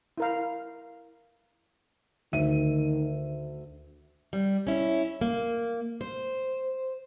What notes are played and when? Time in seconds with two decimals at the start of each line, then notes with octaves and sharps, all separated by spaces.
0.18 E4 A#4 F5
2.33 D2 D#3 E5 D#7
4.33 G3
4.67 C#4 E4
5.21 A#3
6.01 C5